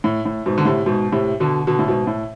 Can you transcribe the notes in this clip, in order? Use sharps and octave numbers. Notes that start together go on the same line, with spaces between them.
A2
A2
G#2 B2
D3
A2 C3
G#2 B2
A2 C3
B2 D3
B2 D3
A2
G#2 B2
A2